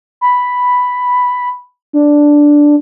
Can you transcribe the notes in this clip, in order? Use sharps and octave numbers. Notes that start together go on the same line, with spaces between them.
B5
D4